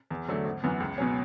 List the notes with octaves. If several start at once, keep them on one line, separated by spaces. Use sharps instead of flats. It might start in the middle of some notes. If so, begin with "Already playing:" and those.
E2
D3 F#3 A3
G#1
F#2 E3 B3
C#2
B2 F#3 C#4